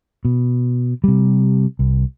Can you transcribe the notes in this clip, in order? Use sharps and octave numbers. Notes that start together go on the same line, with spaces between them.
B2
C3 G3
C2